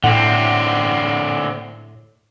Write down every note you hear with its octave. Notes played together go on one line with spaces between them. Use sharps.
A2 D3 C4 F#5